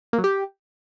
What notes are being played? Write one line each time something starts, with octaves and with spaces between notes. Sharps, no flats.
A#3
F#3
G4